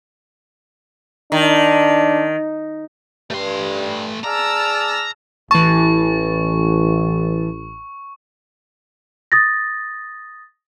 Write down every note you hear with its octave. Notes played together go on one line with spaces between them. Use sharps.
D#3 D4
G2 A3 C6
G#4 D5 A5 A#5 E6 F6
A1 E3 A5 C#6
D#6 A6 A#6